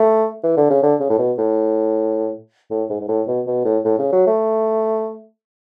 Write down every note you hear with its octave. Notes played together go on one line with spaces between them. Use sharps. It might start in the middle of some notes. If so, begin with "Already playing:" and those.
Already playing: A3
E3
D3
C#3
D3
C#3
A2
B2
A2
A2
G#2
G#2
A2
B2
B2
A2
A2
C#3
F#3
A3